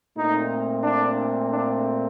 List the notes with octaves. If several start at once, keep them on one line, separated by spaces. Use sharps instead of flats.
A#2 A3 C4 D#4
D4
D4